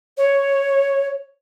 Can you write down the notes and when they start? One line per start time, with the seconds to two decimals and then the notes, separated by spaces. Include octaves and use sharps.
0.17 C#5